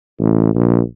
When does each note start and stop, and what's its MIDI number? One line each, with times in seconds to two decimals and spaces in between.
0.20 0.51 33
0.55 0.81 34